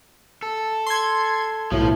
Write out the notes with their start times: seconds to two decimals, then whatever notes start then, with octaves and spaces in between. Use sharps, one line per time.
0.42 A4
0.87 C6 G#6
1.71 B1 A2 F3